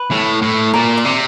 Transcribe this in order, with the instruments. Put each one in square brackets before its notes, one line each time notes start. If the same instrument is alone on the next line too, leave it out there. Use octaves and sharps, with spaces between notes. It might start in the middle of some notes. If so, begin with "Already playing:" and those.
Already playing: [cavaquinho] B4
[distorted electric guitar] A2
A2
[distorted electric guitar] A#2 [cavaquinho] A#4
[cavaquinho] D5
[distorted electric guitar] C3